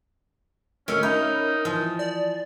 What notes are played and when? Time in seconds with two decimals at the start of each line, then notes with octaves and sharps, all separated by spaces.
0.88 D2 A3 C#4 A#4 D#5 E6
1.03 C#4 D#4 D#5 E5 B5
1.65 E3 F3 D#6
1.99 D5